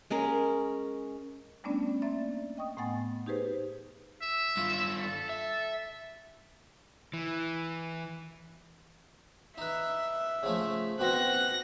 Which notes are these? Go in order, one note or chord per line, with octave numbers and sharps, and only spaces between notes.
G#3 C#4 G#4 A#4
G3 A3 B3 C#4 D4 D5
A#3 C4 D5 E5 A6
D#5 G5 C#6 D#6
A2 A3 B3 F#5 G#5 A6
D#4 G4 G#4 B4 C5
E5
G2 F4
A4
E5
E3
D#4 B4 E5
C#3 F3 A3
B2 C4 F#4 F#6 A#6